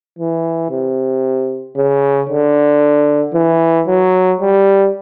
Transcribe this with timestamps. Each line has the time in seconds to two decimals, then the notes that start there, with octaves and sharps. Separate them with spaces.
0.19 E3
0.70 C3
1.77 C#3
2.29 D3
3.34 E3
3.87 F#3
4.40 G3